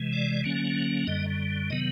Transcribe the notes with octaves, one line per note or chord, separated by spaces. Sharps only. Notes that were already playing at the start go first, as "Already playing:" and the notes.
Already playing: C3 E3 G#3
D5
D3 F#3 A#3 C#4
F#2 D3 G3 D#5
C3 D#3 F#3 B3 D#5